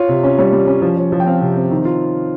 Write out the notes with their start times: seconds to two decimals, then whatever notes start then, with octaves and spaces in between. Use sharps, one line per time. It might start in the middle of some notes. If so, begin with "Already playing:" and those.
Already playing: F4 C#5
0.09 C3
0.23 C#4
0.38 G3 C#5
0.52 G3
0.67 C#4
0.82 F3
0.97 F3
1.12 F3
1.20 G5
1.26 C4 F5
1.41 C3
1.56 C4
1.71 D#3
1.85 F4